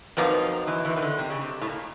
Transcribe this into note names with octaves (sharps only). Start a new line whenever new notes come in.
F2 B2 F3 F#3 A#3 D#4
E2 E3
E2 E3
D#3
D3
C3
C#3
C3
A2
A#2